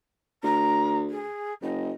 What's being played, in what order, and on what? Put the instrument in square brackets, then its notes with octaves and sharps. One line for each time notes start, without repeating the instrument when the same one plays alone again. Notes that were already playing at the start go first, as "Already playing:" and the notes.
[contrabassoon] D2 [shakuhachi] A#5
[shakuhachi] G#4
[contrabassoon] F#1 [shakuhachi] D#5